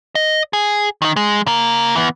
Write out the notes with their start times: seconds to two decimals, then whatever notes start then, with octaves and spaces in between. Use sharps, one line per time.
0.15 D#5
0.53 G#4
1.02 D#3 D#4
1.16 G#3
1.47 C#3 A#3
1.95 E3 B3